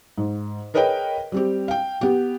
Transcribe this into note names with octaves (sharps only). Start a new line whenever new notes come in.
G#2
G#4 A#4 B4 C#5 D#5 G5
G3 C4 G4
F5 G5
B3 G4